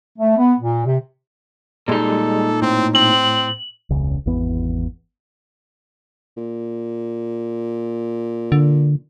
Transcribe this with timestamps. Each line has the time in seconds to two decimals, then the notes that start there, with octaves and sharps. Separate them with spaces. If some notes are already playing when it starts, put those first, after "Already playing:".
0.18 A3
0.37 B3
0.60 A#2
0.86 C3
1.88 A#2 G3 G#3 D#4 A4
2.62 A2 C4
2.95 C4 F#7
3.90 E1 C#2 C#3
4.26 G#1 E2 E3 B3
6.37 A#2
8.52 D3